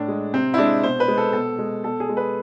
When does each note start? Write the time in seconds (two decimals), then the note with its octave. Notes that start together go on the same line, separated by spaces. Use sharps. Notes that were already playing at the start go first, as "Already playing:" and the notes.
Already playing: A2 D4
0.08 G#3
0.34 C3 C4
0.54 E4
0.58 G#3 D4
0.83 B2 C5
1.00 B4
1.08 G#3
1.18 A4
1.33 B2 A4
1.59 G#3
1.84 B2 A4
2.00 G#4
2.09 G#3
2.17 B4